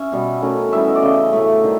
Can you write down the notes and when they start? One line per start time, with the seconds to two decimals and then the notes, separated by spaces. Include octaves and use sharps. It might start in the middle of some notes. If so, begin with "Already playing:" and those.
Already playing: C#4 E5
0.12 B2 G3 B3
0.42 D#3 F#3 A3 C#4
0.72 E3 G3 B3 E5
0.87 D#5
0.95 D5
1.02 C#3 E3 A3 D#5
1.33 A2 F#3 A3 E5
1.62 D#3 G3